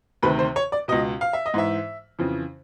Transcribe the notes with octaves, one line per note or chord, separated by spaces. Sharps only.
D2 C3 D#3 B4
C5
C#5
D5
C#2 B2 D#5
F5
E5
D#5
G#2 E3 E5
F2 C#3 E3